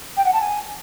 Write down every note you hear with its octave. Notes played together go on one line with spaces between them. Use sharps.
G5
F#5
A5
G#5